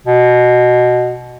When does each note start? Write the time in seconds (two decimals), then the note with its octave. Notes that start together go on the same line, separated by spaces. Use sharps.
0.07 B2